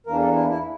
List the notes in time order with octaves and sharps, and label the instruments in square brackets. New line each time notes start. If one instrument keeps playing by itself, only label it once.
[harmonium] E2 E3 A#3 D4 A#4
A4
E4
E4